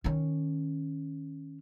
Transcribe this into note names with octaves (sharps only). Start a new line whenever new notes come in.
D#3 C#4